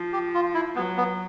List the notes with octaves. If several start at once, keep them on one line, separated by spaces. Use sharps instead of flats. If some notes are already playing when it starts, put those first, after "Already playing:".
Already playing: F3
G4
F4
E4
F#3 B3
B3